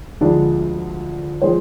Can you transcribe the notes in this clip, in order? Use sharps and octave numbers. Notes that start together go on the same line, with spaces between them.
D2 D3 F3 G#3 D4 D5
F3 G#3 C5